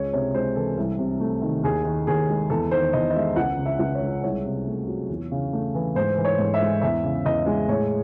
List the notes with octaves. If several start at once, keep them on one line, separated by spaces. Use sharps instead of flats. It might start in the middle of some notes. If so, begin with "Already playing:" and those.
Already playing: C#2 G#3 C#5
C3 C#5
G#3 C5
E3 A4
C2
C3
A3
D#3
D#2 G#4
D#3
D#2 G#4
G#3
E2 A4
D#3 C5
E2 D#5
D#5
G#3 E5
C#2 F#5
C#3
E5
C#2
C#5
G#3
C2 C#5
C3
A3
F#3
E2
C#3
A3
E3
G#2 C5
E3
C#5
G#2
E5
G#3
E2 E5
C#3
E2 D#5
G#3
A2 C#5